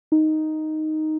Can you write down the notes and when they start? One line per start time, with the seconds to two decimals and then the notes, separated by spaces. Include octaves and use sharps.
0.12 D#4